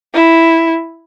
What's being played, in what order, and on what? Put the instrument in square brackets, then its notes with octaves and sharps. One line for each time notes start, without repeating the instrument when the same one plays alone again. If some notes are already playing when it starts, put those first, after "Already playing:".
[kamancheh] E4